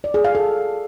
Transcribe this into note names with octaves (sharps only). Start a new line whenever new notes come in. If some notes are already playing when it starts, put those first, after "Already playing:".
D5
G#4
F5
A4